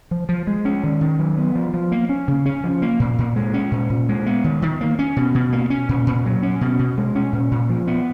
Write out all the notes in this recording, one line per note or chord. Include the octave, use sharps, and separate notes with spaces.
F3
F3
G#3
C#4
D#3
D#3
F#3
B3
F3
F3
A#3
C#4
C#3
C#4
F3
A#3
A#2
A#2
G#3
C#4
A#2
A#2
G#3
B3
D#3
D#3
A#3
C#4
B2
B2
A#3
C#4
A#2
A#2
F#3
C#4
B2
B2
G#3
C#4
A#2
A#2
F3
B3